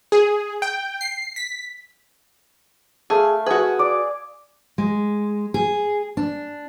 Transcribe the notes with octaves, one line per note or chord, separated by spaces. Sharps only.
G#4
G5
C7
B6
A3 G#4 F5
F#4 G#4 B4
D5 D6
G#3
G#4
D4